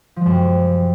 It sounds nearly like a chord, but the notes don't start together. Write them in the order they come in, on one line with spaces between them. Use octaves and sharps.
F3 G#3 F#2 C3